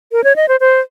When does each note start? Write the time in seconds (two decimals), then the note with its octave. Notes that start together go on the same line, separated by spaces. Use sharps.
0.12 A#4
0.24 C#5
0.36 D#5
0.48 C5
0.60 C5